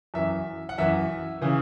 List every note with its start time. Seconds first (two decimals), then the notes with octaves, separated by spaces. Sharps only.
0.14 F#2 E3 E5
0.69 F#5
0.78 F#2 E3 E5
1.42 C#3 E3